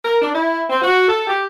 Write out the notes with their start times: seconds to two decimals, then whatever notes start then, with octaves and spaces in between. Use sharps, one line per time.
0.05 A#4
0.22 D4
0.34 E4
0.70 C4
0.82 F#4
1.08 A4
1.27 G4